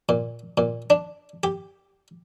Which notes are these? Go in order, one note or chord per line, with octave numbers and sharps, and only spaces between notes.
A#2
A#2
D4
G4